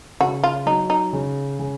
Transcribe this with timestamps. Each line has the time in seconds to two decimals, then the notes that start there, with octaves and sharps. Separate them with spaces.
0.20 C#3 F#4
0.44 F4
0.66 F#3 D#4
0.90 D#4
1.13 C#3
1.59 C#3